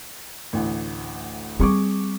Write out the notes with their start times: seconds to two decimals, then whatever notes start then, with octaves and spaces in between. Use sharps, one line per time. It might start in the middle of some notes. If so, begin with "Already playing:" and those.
0.53 A1 D2
1.60 G3 C4 G#4 C#6 D6